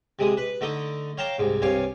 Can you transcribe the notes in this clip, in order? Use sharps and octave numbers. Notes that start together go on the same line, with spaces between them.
C3 G#3 D#6
B4
D3 A3 D#4 D#5
C#5 F5 G5 A5 A#5 D6
C2 G#2
C2 G2 C#5 F5 G#5